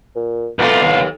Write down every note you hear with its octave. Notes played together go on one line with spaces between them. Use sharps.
A#2
C2 A#2 A3 B3 F4
D#2